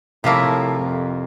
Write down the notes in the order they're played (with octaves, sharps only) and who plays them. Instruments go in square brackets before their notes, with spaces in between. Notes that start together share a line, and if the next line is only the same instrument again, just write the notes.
[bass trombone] A2 [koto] C3 F3 A#3 E4
[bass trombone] F2